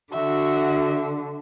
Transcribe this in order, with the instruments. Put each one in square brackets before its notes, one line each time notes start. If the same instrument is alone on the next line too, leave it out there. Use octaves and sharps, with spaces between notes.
[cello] D3 [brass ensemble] F#4 [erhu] E5